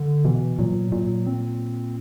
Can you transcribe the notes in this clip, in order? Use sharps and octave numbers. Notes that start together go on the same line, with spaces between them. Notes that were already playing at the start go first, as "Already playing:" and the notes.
Already playing: D3
B2 E3
A#2 F#3
A#2
C4